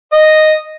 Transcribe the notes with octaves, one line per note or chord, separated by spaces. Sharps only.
D#5